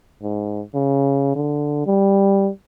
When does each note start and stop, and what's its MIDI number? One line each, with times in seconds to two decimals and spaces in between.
0.22 0.62 44
0.74 1.31 49
1.35 1.85 50
1.86 2.50 55